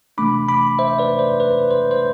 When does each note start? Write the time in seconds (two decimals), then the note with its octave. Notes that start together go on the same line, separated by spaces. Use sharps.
0.18 C3 E3 A3 D4 B5 D6
0.49 B5 D6
0.79 C5 E5
0.99 B4 D5
1.19 C5
1.40 B4
1.71 C5
1.91 C5